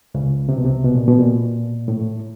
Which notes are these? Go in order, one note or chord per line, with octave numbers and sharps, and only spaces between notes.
C#2 C#3
C3
B2
C2 C3
B2
A#2
B2
A#2
A2